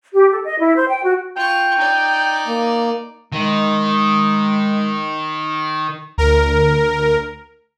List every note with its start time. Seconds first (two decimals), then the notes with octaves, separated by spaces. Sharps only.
0.13 G4
0.31 A4
0.45 D#5
0.61 E4
0.75 C5
0.88 G5
1.03 F#4
1.37 F4 G5 C#6
1.79 D#4 D5
2.47 A#3
3.32 D#3 G#3
6.18 D2 A#4